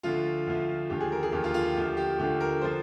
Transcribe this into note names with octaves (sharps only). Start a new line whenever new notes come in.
D2 D3 F3 F4
D2 D3 F3
D#2 D3 F3 G4
G#4
A#4
G#4
D#2 D3 F3 G4
F4
F4
G4
D2 D3 F3 G4
G4
D2 D3 F3 G4
A#4
D3 F3 C5